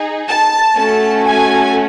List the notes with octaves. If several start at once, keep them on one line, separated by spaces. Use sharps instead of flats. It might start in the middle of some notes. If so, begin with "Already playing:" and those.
Already playing: D#4 G#4
A5
A3 C#4 F#4 A4 A5
G#5